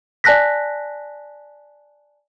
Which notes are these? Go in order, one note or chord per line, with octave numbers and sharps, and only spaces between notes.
D5 G#5 A5 F#6 A#6 B6